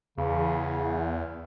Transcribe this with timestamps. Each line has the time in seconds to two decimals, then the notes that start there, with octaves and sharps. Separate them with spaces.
0.18 E2 C#3